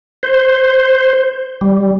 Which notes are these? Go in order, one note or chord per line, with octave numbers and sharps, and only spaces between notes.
C5
G3